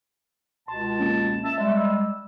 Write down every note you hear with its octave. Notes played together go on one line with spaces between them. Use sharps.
C#2 B2 A5 C6
F2 A#3 C#4
E5 A5
G3 G#3 E5
E6